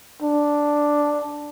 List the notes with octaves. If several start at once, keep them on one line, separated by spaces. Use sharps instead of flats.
D4